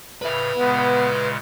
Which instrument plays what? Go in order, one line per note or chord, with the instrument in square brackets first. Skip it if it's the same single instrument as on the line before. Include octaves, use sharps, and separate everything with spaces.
[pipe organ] A2 C#3 [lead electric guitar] B4 E5
[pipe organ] A#2 C#3 G#3 [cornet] B3